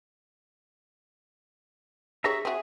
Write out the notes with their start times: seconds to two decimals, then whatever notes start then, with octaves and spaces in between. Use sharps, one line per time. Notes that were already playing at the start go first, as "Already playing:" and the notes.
2.24 D4 G4 G#4 C#5 E5 A#5
2.45 C4 F#4 G#4 E5